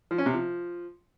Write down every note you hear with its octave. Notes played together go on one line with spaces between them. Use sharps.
F3
C#4
C3
F3